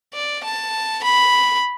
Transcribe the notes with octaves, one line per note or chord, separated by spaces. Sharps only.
D5
A5
B5